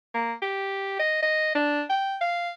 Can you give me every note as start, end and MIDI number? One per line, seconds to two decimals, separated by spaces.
0.14 0.33 58
0.42 0.97 67
0.99 1.18 75
1.23 1.53 75
1.55 1.83 62
1.90 2.16 79
2.21 2.52 77